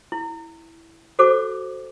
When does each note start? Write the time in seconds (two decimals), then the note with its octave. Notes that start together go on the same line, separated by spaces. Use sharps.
0.12 E4
1.19 F#4 A4 C5 D6